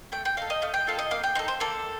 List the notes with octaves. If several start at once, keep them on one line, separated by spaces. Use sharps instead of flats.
A3 G5
G5
D#4 A4 F5
D#5
A3 F5
G5
C4 F4 A4 F5
D#5
A#3 F5
G5
D#4 A4 C5
C5
A#3 A4